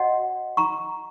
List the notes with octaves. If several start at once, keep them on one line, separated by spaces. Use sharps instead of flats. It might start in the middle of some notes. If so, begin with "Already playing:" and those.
Already playing: F#4 C#5 D#5 F#5
A#5 C#6